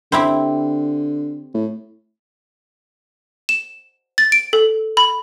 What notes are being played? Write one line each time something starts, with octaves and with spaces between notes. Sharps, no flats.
D3 C4 E4 G4
A2
E7
A6
D7
A4
B5